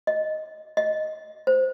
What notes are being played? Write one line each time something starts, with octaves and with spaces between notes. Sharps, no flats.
D#5
D#5
C5